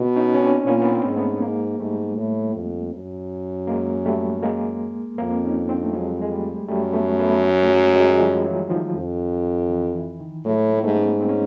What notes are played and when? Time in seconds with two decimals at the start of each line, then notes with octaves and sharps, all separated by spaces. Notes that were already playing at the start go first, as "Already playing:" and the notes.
Already playing: B2
0.16 C#4 D#4
0.35 C#4
0.42 C4 D4
0.66 A#2 B3 C#4
0.82 B3
0.92 A#3 C4
1.04 G#2
1.11 C4
1.16 A3 B3
1.42 G#2 G#3 A#3
1.79 G#2 G3 A3
2.17 A2
2.55 F2
2.93 F#2
3.67 G#3 A#3
4.06 G3 A3
4.42 G#3 A#3
5.18 F2 A#3 C4
5.44 C#4 D#4
5.69 C4 D4
5.83 A3
5.93 F#3 G#3
6.11 G3
6.22 G#3
6.31 G3 A3
6.68 F#2 G3 A3
6.93 A3 B3
7.20 A3 B3
7.62 A3
7.69 F#3 G#3
7.94 F#3 G#3
8.10 G#3
8.19 F3 G3
8.44 E3 F#3
8.69 D#3 F3
8.95 F2
9.70 E3
9.95 E3
10.20 D#3
10.45 A2 F#3 G#3
10.70 A3
10.77 A#3
10.83 G#2 G3 A3
10.95 B3 C#4
11.20 C4
11.29 C#4